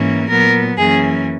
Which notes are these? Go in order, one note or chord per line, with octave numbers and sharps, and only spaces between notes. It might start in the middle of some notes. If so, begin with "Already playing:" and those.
Already playing: G#2 E3 A#3 C#4
A#2 F#3 B3 A#4
F#2 E3 A#3 C#4 G#4